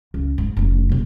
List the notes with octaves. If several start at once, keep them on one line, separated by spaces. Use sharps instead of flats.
C#2
G#2
F1 C#3
C3 A#3